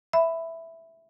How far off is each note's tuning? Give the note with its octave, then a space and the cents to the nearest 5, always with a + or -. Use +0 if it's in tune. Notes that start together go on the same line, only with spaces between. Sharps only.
E5 +0 B5 +10